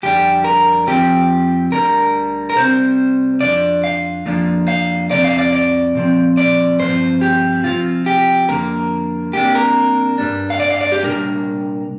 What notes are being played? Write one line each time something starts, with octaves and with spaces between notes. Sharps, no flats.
F2 D3 G3 D4 G4
A#4
F2 F3 C4 G4
D2 D3 G3 A#4
A#4
C3 G3 C4 C5
F2 F3 D4 D5
F5
F2 F3 A#3 D4
F5
F2 C3 F3 C4 D5
F5
D5
D5
A#2 F3 C4
D5
G2 F3 C4 C5
G4
C3 F3 C4 F4
G4
F2 D3 A#3 A#4
C2 C3 A#3 D4 G4
A#4
G2 G3 D4
F5
D5
F5
D5
G4
C2 A#2 G3 D4 A#4